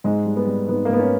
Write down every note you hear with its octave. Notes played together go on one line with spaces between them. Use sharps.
G#2 G#3
G3
B3
G3
G#2 B3
A#3
G#2 B3
C#4